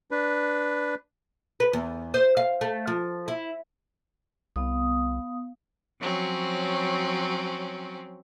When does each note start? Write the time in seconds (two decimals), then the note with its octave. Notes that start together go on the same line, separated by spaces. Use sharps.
0.11 D4 B4
1.60 B4
1.73 E2
2.14 C5
2.37 F5
2.61 A3
2.87 F3
3.28 E4
4.56 C2 B3 F5 D#6
6.00 F3 F#3 C4 C#4